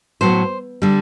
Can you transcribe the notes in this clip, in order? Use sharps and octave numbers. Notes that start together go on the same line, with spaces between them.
A2 F#3 B3 C5
D3 G3